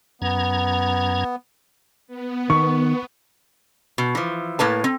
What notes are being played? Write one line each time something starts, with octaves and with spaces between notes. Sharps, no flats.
F#2 B3 A#5 G#6
B3
D#3 C#6
B2
E3 F3
A2 A#3 B4 A5
C4